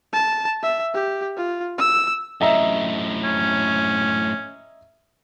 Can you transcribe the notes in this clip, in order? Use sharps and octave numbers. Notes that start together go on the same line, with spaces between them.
A5
E5
G4
F4
E6
F#2 A2 D#5 E5 A#5
C#4